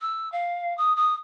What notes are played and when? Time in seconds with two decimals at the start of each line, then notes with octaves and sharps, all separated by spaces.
0.01 E6
0.32 F5
0.78 D#6
0.97 D#6